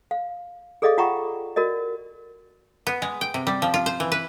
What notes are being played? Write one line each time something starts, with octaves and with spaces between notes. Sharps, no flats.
F5
G#4 A4 D5 D#5 F5 D6
F4 E5 F#5 G5 A#5 C#6
F#4 A#4 D5 D#5
B3
G#3
G5
C3
G3
F3
F4
C5
E3
B4